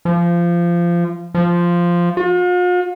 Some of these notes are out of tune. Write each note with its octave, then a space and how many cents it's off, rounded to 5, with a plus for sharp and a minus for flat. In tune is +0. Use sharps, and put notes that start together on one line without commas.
F3 -20
F3 -5
F4 +45